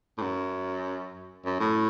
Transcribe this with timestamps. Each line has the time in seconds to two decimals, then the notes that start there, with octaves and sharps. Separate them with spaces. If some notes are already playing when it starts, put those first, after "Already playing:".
0.18 A2
0.22 F#2
1.45 F#2
1.60 A2